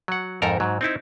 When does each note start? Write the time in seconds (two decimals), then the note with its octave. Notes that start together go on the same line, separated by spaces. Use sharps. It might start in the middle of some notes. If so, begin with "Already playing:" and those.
0.08 F#3 F#5
0.42 F2 G#2 A4 A#4 A#5
0.60 G#2 F#3
0.81 C4 D#4 E4